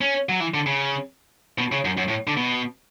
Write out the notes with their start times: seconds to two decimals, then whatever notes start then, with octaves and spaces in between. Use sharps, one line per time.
0.01 C#4
0.29 F#3
0.40 E3
0.54 D3
0.66 C#3
1.58 B2
1.72 C#3
1.85 F#2
1.97 F#2
2.08 A2
2.27 D3
2.37 B2